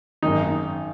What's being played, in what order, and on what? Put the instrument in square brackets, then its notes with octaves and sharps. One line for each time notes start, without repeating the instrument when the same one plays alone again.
[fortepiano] G#1 F#2 D#3 D#4